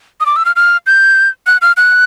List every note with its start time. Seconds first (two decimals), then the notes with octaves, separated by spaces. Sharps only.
0.20 D#6
0.26 D6
0.36 E6
0.45 F6
0.56 F6
0.87 G6
1.47 F#6
1.62 F6
1.77 F#6